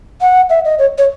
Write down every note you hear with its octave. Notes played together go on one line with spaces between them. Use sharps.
F#5
E5
D#5
C#5
C#5